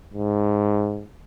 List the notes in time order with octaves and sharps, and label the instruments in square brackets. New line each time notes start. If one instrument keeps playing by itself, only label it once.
[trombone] G#2